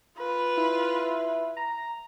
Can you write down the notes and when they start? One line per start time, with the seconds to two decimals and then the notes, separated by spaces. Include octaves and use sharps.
0.18 F4 B4
0.57 E4
1.57 A#5